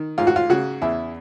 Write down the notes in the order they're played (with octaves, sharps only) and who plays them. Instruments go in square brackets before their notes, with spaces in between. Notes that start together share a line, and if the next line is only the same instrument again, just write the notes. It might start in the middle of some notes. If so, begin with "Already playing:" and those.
Already playing: [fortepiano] D#3
G#2 F4
F#4
F4
C#3 F#4
E2 E4